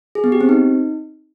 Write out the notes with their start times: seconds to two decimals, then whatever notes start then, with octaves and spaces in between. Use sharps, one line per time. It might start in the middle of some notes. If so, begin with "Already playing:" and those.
0.15 G#4
0.24 B3
0.32 G4
0.41 C4
0.49 D#4